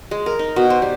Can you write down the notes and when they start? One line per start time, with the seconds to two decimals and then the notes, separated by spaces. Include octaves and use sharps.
0.11 G#3
0.26 A#4
0.39 D#4
0.56 B2
0.70 C5
0.82 G3